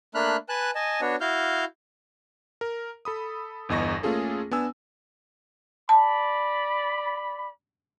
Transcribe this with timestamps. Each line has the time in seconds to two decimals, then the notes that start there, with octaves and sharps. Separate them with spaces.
0.15 A3 A#3 D4 B5 F6 F#6
0.49 B4 G#5 A5 F#6
0.75 D#5 G#5 A5
1.01 B3 D4 F#4 C#5
1.21 E4 F#4 F5 F6 G6
2.61 A#4
3.05 A4 B5 D#6
3.69 G1 E2 D#5 C#6 A#6
4.03 A3 A#3 C#4 F4 G#4 A4
4.51 B3 D4 G#5 E6
5.89 D5 A5 B5